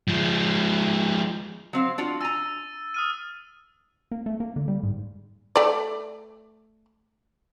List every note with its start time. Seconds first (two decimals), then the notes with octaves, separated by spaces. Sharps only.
0.08 F3 G#3
1.73 F#3 C4 F5
1.98 D4 F4 F#4
2.21 G#5 A#5 E6 A6 D#7
2.94 D#6 F6 D#7
4.11 A#3
4.26 A3
4.40 A#3
4.56 D3
4.68 G3
4.83 G#2
5.56 A3 D5